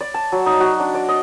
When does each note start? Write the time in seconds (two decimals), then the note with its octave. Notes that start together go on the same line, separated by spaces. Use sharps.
0.01 D5
0.14 A5
0.32 F#3
0.46 D#4
0.60 F#4
0.80 D4
0.95 D5
1.09 D#5